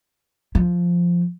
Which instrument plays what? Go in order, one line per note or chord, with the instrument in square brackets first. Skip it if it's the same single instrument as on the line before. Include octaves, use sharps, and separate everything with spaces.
[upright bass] F3